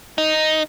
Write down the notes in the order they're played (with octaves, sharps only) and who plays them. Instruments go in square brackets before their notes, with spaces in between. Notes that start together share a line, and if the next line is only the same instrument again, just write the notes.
[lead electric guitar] D#4